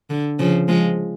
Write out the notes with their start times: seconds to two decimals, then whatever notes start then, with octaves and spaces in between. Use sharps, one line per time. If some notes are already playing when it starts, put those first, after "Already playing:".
0.10 D3
0.39 C#3 F3
0.68 F3 G#3